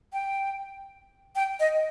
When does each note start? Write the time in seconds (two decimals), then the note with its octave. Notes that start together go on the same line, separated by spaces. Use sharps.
0.13 G5
1.36 G5
1.60 D#5